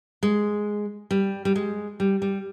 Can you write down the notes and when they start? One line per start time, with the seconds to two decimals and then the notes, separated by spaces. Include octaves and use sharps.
0.23 G#3
1.11 G3
1.45 G3
1.56 G#3
2.00 G3
2.22 G3